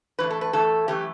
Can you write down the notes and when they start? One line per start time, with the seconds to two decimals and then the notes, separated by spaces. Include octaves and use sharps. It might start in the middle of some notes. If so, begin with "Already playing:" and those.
0.19 A2 E3 A3 B4
0.30 A4
0.41 B4
0.53 A2 E3 A3 A4
0.88 F#2 E3 A3 G4